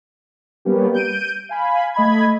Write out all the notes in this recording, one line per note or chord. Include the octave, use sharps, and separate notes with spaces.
G3 A#3 B3 C#4 G4
G6 D7 D#7
F5 G#5 B5
A3 D#5 B5 G#6